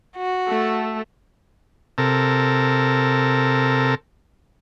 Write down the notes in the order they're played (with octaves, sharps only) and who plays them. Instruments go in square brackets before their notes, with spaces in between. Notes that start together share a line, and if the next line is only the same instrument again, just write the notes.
[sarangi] F#4
[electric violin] A3 A4
[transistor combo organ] C3 A4 A#4